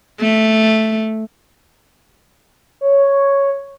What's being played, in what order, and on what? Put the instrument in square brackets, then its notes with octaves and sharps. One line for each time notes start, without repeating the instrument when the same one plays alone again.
[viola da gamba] A3
[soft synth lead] C#5